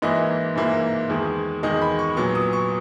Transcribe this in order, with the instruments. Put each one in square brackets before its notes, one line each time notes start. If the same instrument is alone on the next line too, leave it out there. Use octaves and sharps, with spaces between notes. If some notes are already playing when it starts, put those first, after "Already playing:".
[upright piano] G#2 E3 A#3 E4 D#5
G#2 E3 A#3 E4
E2 D#3 G#3
E2 D#3 G#3 D#5
B5
C#6
A#2 F#3 B3 C#6
D#6
C#6